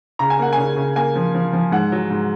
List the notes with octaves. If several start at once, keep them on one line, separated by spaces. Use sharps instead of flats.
C#3 A#5
G#5
A#3 F#5
G#5
C#3
C#3
A#3 G#5
F3
F3
F3
G#2 F#5
F#3
G#2